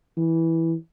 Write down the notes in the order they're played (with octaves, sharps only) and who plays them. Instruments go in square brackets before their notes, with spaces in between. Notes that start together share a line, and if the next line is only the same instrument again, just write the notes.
[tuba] E3